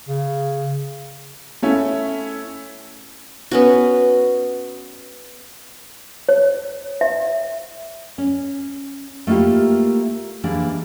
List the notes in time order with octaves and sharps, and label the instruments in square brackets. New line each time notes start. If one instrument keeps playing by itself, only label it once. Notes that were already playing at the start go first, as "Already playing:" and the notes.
[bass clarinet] C#3
[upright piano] A3 C#4 E4
[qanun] B3 C#4 F#4
[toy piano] C#5
E5
[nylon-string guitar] C#4
A3 A#3 E4 F4 G4
E3 G3 G#3 A#3 D4